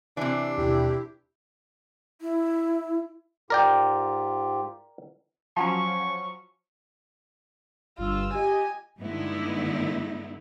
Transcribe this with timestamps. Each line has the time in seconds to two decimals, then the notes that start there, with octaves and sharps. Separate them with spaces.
0.17 C3 E3 D4
0.58 D#2 B2 E4 G4
2.21 E4
3.50 G#2 F4 G4 A#4 D5 G5
5.57 F3 F#3 C#4 C#6
7.98 G1 G2 F4 E6
8.34 G4 D#5 G#5
9.00 G2 D3 G#3 B3 D#4 E4